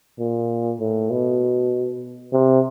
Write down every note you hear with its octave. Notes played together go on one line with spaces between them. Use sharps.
A#2
A2
B2
C3